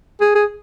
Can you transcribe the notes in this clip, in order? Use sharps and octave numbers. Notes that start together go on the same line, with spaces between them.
G#4
G#4